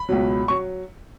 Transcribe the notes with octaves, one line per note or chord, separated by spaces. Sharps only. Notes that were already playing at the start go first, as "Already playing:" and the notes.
Already playing: B5
C#2 B2 F#3
F#3 C#6